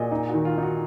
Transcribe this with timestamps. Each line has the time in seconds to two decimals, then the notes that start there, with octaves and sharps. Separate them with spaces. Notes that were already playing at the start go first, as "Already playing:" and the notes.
Already playing: A#2 F#4 G#4 D5 D#5
0.11 D#4 D#5
0.28 F#4
0.34 D#3
0.45 F4
0.57 D#4
0.63 F#4